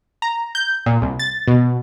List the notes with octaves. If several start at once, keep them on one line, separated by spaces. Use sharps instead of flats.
A#5
G6
A#2
C2
A6
B2